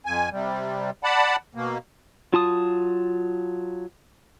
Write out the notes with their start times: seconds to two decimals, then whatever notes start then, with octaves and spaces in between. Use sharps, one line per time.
0.06 F2 G#5
0.32 C3 G3
1.04 D5 F#5 A5 B5
1.55 B2 A#3
2.33 F#3 F4 A5 D#6